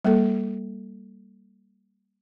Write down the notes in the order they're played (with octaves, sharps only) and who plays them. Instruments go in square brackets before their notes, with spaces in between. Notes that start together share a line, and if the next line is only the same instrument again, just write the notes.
[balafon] G3 A#3 A4